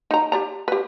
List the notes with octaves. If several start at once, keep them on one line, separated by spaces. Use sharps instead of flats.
D#4 A#5
G4 D5 A#5
G4 B4